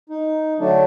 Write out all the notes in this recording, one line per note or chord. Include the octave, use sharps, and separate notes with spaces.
D#4
D3 F#3 A3 D4